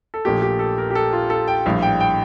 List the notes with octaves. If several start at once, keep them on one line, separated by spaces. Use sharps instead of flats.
A4
A#1 A#2 A3 G4
G4
A4
A#4
G4
A4
F4
A4
G5
A#1 A2 G3 F5
G5
G5